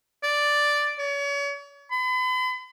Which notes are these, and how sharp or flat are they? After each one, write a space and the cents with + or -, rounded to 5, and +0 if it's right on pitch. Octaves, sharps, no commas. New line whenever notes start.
D5 +0
C#5 +35
B5 +40